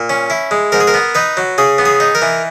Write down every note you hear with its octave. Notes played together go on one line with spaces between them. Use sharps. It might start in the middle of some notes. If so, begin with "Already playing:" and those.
Already playing: A#2
C#4
E4
G#3
G#2 A#4
G#4
A#4
B3
D#4 B4
F#3
C#3 G#4
B3
G#4
D#4
A#4
E3